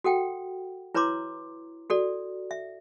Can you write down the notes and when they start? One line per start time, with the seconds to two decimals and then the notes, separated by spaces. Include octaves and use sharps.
0.04 F#4 A4 F#5 G5
0.94 E4 B4 C#5 A#5 C6 D6
1.90 F#4 A4 D5
2.51 E5